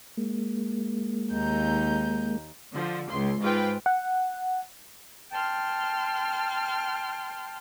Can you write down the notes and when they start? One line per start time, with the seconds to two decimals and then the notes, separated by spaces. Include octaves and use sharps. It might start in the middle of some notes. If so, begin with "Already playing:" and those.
0.17 G#3 A#3
1.32 D#2 D#4 G6
2.73 D3 F3
3.10 C#2 C6
3.40 G#2 F4 B4 G5
3.86 F#5
5.30 G5 A5 C6 F6